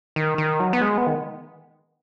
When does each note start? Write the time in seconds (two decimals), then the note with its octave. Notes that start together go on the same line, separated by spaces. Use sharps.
0.16 D#3
0.38 D#3
0.60 F#3
0.73 B3
0.81 G#3
0.98 B3
1.07 D#3